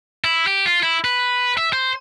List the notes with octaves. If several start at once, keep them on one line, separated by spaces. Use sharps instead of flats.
E4
G4
F4
E4
B4
E5
C5